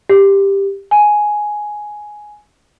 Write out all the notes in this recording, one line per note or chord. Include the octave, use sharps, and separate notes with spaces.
G4
G#5